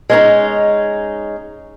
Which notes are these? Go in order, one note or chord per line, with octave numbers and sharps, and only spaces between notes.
G#3 C#4 D#4